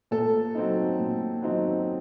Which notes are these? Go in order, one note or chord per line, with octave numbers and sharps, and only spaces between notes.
A#2 A4
F#3 C4 D#4
A#2
F#3 C4 D#4